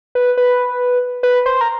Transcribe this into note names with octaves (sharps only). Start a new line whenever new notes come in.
B4
B4
B4
C5
A#4